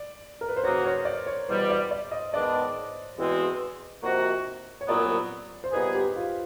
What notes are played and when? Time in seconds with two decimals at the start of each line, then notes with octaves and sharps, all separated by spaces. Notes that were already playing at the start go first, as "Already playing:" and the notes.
Already playing: D5
0.41 A#4
0.49 B4
0.57 C5
0.63 C#3 F#3 A#3 D#4 F#4 C#5
0.85 C#5
1.05 D5
1.27 C#5
1.48 E2 B2 G3 C5
1.70 D5
1.91 D5
2.11 D#5
2.34 D#3 G#3 B3 D4 D5
3.18 E2 B2 G#3 C4
4.03 C3 F3 A#3 D#4 F#4
4.81 C#5
4.88 C2 A#2 F#3 B3 D5
5.64 C5
5.73 A#2 G3 B3 D#4 G#4 B4
5.95 G4
6.16 F4